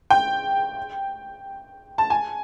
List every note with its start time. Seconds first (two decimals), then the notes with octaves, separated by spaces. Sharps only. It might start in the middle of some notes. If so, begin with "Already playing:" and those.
0.10 G5
1.98 A5
2.10 G#5